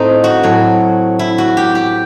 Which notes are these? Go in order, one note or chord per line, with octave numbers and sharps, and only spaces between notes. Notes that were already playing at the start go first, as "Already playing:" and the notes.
Already playing: A2 A3 C4 D#4
F#4
A2 F#3
E4
F#4
G4
G4